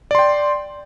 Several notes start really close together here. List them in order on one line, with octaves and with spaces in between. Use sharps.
D5 C6 G5